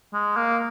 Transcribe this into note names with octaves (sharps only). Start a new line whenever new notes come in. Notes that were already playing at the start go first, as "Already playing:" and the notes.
G#3
A#3